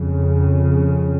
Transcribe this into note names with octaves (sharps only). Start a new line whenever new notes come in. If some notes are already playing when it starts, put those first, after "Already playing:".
Already playing: F2 C#3